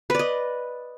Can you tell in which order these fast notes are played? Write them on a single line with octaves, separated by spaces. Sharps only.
B4 D5 D#5